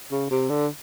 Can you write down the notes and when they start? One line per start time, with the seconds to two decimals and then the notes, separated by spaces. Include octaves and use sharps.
0.11 C#3
0.30 C3
0.49 D3